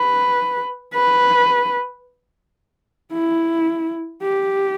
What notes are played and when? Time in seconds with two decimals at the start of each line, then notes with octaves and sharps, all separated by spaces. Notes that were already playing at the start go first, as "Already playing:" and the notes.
Already playing: B4
0.94 B4
3.13 E4
4.22 G4